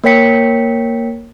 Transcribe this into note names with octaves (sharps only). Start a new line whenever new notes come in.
A#3 A#4 C#5 G5 B6 C#7